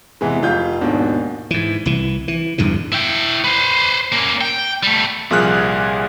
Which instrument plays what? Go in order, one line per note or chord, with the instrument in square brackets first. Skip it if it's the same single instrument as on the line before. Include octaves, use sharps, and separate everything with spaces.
[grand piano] E2 C3 E3 G#3
F1 F4 G6
D#2 G#2 B2 D4
[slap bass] G#2 E3
C2 E3
E3
E2 G2 D3 E3
[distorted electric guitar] E4 G5
B4 C5
A#3 C#4
G5
G3 A3
[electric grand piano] C2 A#2 F3 G#4 F6 F#6